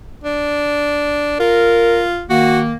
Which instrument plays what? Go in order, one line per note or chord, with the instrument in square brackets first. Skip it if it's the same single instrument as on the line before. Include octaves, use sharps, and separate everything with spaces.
[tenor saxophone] D4
[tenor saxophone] F4 [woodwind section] A#4
[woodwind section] D#3 A#3 [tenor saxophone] F#4